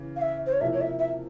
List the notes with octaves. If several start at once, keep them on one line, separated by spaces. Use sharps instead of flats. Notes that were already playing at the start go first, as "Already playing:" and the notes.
Already playing: C#3 E3
F5
E5
C5
C#5
C3 F3 A#3 E4 E5
C#5
E5
E5